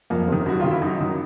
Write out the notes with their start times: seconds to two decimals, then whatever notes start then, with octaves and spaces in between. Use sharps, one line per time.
0.10 F2 A#3
0.28 C3 D#3
0.46 F#2 F#4
0.60 D#3 F4
0.71 E4
0.82 F#2 D#4
1.00 D#3